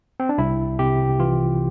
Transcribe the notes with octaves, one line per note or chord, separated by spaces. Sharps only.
C4
D4
C2 E4
C3 G4
E3 F4